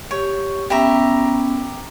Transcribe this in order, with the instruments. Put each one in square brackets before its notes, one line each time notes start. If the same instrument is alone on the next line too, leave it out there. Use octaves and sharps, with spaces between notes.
[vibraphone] G4 [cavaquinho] C#5
[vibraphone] B3 C#4 [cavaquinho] G4 E5 A#5